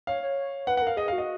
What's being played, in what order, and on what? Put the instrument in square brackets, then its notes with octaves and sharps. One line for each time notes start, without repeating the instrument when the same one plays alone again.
[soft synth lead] C#5 [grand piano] F5
[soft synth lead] C#5
[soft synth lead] B4 [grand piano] F#5
[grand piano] F#5
[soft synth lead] A#4
[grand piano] F5
[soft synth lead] G#4 [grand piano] D#5
[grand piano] F5
[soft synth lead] F#4
[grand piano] D#5